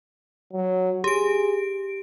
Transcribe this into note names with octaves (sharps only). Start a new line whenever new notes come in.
F#3
G4 G#4 D7